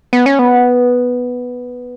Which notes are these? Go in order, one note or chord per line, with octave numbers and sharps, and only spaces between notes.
B3
C#4
B3